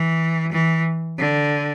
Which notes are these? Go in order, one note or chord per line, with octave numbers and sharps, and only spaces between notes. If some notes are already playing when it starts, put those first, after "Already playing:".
Already playing: E3
E3
D3